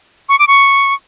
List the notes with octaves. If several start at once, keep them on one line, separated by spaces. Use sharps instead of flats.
C#6
D6
C#6